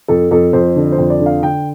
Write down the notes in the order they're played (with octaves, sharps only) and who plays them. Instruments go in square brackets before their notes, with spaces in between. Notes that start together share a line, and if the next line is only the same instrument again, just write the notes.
[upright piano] F2 A4
F2 A4
F2 C5
D3
C5
F2
D5
D3
F5
D3 G5